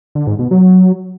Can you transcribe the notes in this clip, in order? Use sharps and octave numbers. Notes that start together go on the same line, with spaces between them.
D3
G#2
B2
F#3